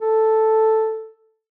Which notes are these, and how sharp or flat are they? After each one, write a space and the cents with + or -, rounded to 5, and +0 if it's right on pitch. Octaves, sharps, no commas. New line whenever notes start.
A4 +0